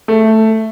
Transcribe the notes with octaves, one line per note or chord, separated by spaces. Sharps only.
A3